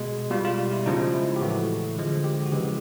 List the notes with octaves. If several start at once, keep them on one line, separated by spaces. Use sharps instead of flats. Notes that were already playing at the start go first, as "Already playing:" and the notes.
Already playing: B2 G#3
B2 G3 F4
F4
F4
E4
C#3 F3 G#3 D#4
E4
G4
A2 E3 A3 F#4
D3 F3 G#3
G4
F#4
C#3 E3 G#3 G4